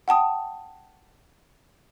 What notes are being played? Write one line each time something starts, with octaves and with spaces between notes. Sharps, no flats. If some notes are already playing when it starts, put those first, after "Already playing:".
F#5 G5 A5 D#6